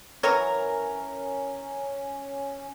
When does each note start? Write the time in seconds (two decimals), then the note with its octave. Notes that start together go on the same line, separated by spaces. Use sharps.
0.23 E3 F#3 C#4 A#4 C#5